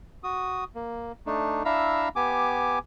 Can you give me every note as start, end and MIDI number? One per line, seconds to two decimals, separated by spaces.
0.24 0.64 66
0.24 0.64 87
0.75 1.12 58
1.26 1.63 57
1.26 1.63 62
1.26 1.63 63
1.65 2.09 62
1.65 2.09 64
1.65 2.09 76
1.65 2.09 77
1.65 2.09 82
1.65 2.09 88
2.16 2.79 59
2.16 2.79 67
2.16 2.79 80
2.16 2.79 86